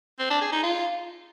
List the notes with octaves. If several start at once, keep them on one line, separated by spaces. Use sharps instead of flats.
C4
D4
G#4
D#4
F4